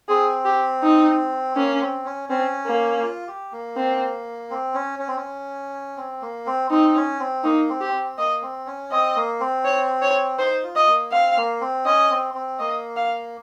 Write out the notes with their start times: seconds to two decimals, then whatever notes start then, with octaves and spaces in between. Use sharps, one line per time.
0.08 C4 G#4
0.45 G4
0.83 D#4
1.56 A#3 C#4
1.80 C4
2.05 C#4
2.29 C4 C#4
2.66 A#3
3.03 F4
3.28 G4
3.52 A#3
3.76 C4
4.50 C4
4.74 C#4
4.99 C#4
5.08 C4
5.17 C#4
5.97 C4
6.22 A#3
6.46 C4
6.70 C4 D#4
6.96 C#4
7.20 C4
7.44 A#3 D#4
7.69 C4
7.81 G4
7.93 C4
8.18 A#3 D#5
8.42 C4
8.67 C#4
8.91 C4 D#5
9.16 A#3
9.40 C4
9.65 C#5
10.02 C#5
10.38 D#4 C5
10.63 F4
10.75 D#5
10.87 A#3
11.12 C4 F5
11.37 A#3
11.61 C4
11.85 C#4 D#5
12.10 C4
12.34 C4
12.59 A#3 D#5
12.96 F5